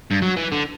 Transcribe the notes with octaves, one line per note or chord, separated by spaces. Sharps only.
G2
F#3
E3
D3